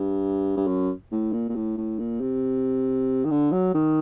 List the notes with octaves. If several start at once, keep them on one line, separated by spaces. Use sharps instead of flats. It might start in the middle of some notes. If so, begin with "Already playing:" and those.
Already playing: G2
G2
F#2
A2
A#2
A#2
A2
A2
A#2
C3
D#3
D3
F#3
D#3